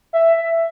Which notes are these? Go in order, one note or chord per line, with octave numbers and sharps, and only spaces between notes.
E5